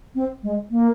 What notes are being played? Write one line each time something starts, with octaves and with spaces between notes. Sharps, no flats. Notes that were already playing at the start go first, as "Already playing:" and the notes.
C4
G#3
A#3